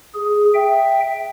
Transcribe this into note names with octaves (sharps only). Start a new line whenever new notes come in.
G#4
E5 G5